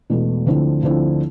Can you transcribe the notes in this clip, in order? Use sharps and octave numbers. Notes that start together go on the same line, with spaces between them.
E1 E2 B2 A3
D2 D3 F3 C4 E4
D2 D3 F3 C4 E4